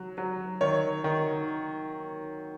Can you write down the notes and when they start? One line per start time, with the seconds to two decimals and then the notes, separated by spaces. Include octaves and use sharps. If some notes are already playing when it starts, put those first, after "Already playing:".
Already playing: F#3
0.18 F#3
0.61 D#3 C#5
1.04 D#3